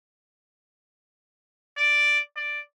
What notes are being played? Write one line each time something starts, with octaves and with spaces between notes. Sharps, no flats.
D5
D5